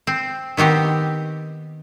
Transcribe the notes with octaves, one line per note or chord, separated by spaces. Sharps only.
C4
D#3 B3 C4 G4